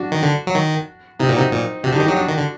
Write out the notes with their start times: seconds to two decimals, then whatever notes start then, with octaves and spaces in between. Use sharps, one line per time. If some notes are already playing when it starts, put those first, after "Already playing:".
Already playing: D4 F#4
0.12 D#3
0.23 D3
0.47 F#3
0.55 D#3
1.19 C3 D#4
1.27 A#2 F#4
1.35 C3 C4 D#4
1.52 A#2
1.84 C3 D4 F#4
1.92 D3
1.95 D#4 G4
2.00 D#3
2.05 F#3 D#4 G4
2.16 F#3 D4 F#4
2.28 D#3
2.38 D3